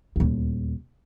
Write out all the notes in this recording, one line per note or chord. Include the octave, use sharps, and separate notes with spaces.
D#1 D2